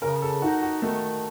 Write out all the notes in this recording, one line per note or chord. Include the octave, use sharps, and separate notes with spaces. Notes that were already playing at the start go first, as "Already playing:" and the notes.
C#3 A#4
A4
D#4 F#4
F#4
D#3 A3